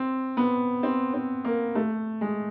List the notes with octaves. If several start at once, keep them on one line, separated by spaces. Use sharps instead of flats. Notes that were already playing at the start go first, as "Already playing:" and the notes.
Already playing: C4
B3
C4
C4
A#3
A3
G#3